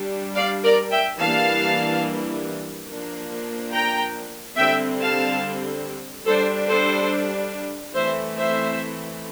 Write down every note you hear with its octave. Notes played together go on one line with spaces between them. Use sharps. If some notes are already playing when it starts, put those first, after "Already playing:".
Already playing: G3 D4
D5 F5
A#4 D5
E5 G5
E3 G3 A#3 D4 F5 A5
F3 A#3 D4
G5 A#5
D3 G3 C4 E5 G5
F5 A5
G3 D4 A4 C5
A4 C5
E3 A3 C4 C5 E5
C5 E5